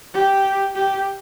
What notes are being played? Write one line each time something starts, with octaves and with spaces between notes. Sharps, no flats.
G4
G4